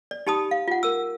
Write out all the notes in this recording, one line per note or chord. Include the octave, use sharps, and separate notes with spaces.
D5
D#4 G4 A5 B5 D#6
F5
F4 F#5
A#4 E6